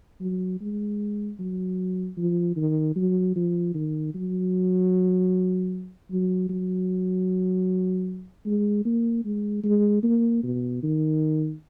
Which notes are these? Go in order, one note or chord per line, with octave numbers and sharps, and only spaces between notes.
F#3
G#3
F#3
F3
D#3
F#3
F3
D#3
F#3
F#3
F#3
G#3
A#3
G#3
G#3
A#3
B2
D#3